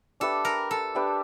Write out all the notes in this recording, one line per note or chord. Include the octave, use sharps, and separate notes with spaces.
D4 G4 A4 B4 E5
A#4
A4
D4 G4 B4 E5